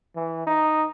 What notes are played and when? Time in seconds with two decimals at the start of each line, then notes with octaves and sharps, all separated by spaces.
0.16 E3
0.47 D#4